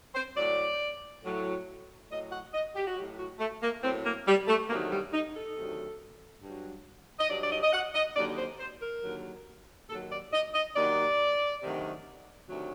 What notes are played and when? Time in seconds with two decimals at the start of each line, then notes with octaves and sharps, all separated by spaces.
0.15 C5
0.37 A2 F#3 D5
1.24 A2 F#3
2.10 A2 F#3 D#5
2.32 F#5
2.53 D#5
2.75 G4
2.87 F#4
2.96 F#3 G4
3.01 A2
3.18 F#4
3.39 A3
3.62 A#3
3.83 A2 F#3 C4
4.05 A#3
4.27 G3
4.48 A3
4.69 D2 C3 D#3 F#3 A#3
4.91 G3
5.13 D#4
5.35 A4
5.57 D2 C3 D#3 F#3
6.42 G2 F#3
7.19 D#5
7.29 G2 F#3 D5
7.42 D5
7.51 D#5
7.63 D#5
7.73 F#5
7.95 D#5
8.16 D#2 D3 F#3 D5
8.37 C5
8.59 C5
8.81 A#4
9.02 D#2 D3 F#3
9.88 D#2 D#3 F#3 A4
10.11 D5
10.33 D#5
10.54 D#5
10.75 D#2 D#3 F#3 D5
11.62 D2 C3 D#3 F#3
12.48 D2 C3 D#3 F#3